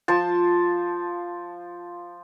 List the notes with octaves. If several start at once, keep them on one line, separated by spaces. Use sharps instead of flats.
F3 C5 A5